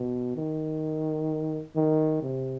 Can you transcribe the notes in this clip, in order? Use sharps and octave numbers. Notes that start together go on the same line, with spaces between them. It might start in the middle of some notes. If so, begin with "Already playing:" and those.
Already playing: B2
D#3
D#3
C3